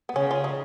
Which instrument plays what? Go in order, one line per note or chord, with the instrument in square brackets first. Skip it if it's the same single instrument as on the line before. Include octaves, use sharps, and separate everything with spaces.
[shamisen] B3
[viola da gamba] C#3 [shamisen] C#4
[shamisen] F4
D#4